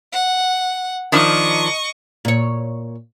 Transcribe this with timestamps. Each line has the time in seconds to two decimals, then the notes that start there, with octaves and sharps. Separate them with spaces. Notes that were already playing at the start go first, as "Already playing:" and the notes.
0.12 F#5
1.12 D#3 F3 D4 D#5 C#6
2.25 A#2 C#5